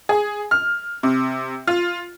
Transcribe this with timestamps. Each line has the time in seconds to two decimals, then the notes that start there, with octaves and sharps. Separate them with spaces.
0.09 G#4
0.51 F6
1.03 C3
1.67 F4